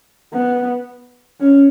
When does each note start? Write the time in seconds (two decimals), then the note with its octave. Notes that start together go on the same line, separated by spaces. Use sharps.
0.33 B3
1.40 C#4